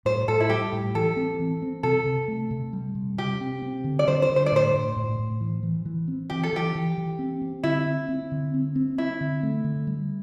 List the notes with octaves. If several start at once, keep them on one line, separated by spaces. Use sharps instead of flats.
A2 C5
A2 A4
E4
G3 G4
A2
E3 A4
C4
E3
C4
C3 A4
C3
A3
C3
G3
C3
C3 G4
C4
C4
D3
D5
D3 C5
C5
D3
C5
D5
A2 C5
A2
A2
A2
E3
E3
E3
C4
E3 G4
A4
E3 G4
E3
E3
C4
C4
D3 E4
C4
C4
D3
C4
C4
C4 E4
D3
A3
D3
G3